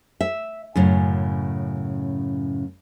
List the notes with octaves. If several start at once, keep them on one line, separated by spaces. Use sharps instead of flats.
E5
F#2 A2 C#3